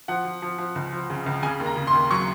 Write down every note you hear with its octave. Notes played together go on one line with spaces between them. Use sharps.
F3 F#5
F3
F3
F3
C#2
F3
C#3
C#2
C#3 G#5
D#2
A#5
C#3
C6
D#2
F#3 C#6